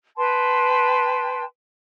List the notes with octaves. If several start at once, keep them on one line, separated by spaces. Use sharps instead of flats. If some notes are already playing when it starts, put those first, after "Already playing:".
B4 G5 A5 C6